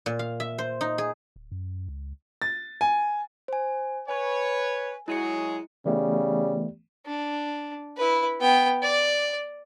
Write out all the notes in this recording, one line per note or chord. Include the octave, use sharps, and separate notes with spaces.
A#2
F5
E5
C5
D#4
G#4
D1
F#2
C#2
A6
G#5
C5 G#5
B4 C#5 G#5
F#3 G#3 E4 G#4 C#7
C#3 E3 G3 A3 B3
D4
E4 B4
B3 G5
D5